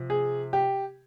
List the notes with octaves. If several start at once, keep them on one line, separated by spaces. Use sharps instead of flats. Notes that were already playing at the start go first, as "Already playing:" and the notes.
Already playing: C3 F3
G#4
G4